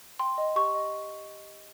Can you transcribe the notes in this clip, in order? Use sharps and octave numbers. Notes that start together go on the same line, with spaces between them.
G5 C6
D#5
G4 C#6
D#5